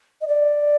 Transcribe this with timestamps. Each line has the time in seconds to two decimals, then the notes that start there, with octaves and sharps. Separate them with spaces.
0.21 D#5
0.27 D5